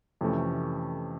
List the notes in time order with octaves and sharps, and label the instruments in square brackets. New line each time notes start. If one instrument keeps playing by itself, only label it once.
[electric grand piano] F2 C3 E3 A3 C#4